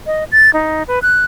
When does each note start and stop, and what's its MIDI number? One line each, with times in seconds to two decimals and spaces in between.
0.06 0.24 75
0.32 0.50 93
0.54 0.83 63
0.88 0.99 71
1.02 1.25 90